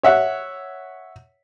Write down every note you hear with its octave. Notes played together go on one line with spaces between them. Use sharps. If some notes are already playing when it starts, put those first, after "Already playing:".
C#5 E5 F#5